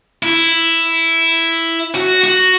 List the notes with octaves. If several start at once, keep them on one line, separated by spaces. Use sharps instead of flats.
E4
F#4
F#4